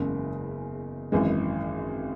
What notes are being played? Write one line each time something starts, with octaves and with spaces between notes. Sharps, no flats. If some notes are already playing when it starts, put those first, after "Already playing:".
Already playing: F#1 E2 C#3 G#3
G#1 F#2 E3 G#3